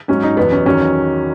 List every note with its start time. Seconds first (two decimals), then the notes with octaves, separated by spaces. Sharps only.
0.08 G#2 F#3 C#4
0.23 D#4
0.37 E2 B2 F#3 B3
0.52 C#4
0.66 E2 D#3 F#3 C#4